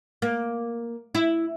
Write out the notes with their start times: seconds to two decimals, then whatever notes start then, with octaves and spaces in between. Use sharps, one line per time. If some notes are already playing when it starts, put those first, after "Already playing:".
0.22 A#3
1.15 E4